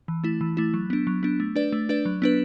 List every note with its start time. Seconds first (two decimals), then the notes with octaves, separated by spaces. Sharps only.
0.08 E3
0.24 A3 E4
0.41 E3
0.57 A3 E4
0.74 F#3
0.90 B3 D4
1.07 F#3
1.23 B3 D4
1.40 A3
1.56 D4 B4 D5
1.72 A3
1.89 D4 B4 D5
2.05 F#3
2.22 B3 D4 B4